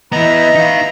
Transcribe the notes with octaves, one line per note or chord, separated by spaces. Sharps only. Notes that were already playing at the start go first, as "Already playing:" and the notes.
E3 B3 B4 D#5 E5 A#5
D#4 F5